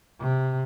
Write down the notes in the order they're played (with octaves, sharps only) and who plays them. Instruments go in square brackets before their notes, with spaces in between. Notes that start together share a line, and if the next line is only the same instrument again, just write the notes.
[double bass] C3